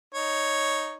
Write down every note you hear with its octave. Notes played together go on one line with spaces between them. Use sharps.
D#4 C#5